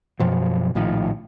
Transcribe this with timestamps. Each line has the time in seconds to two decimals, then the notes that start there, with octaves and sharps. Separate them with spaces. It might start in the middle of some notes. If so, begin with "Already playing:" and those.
0.20 F#2 B2 F3 F#3
0.75 A#1 A2 D#3 F3